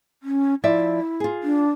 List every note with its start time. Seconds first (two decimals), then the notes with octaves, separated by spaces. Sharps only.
0.23 C#4
0.64 F3 E4 D5 E5
1.20 F4 G#4
1.43 D4